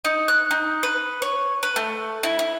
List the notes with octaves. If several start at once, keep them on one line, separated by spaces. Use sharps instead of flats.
D#4
F#6
D#4
B4
C#5
B4
A3
E4
E4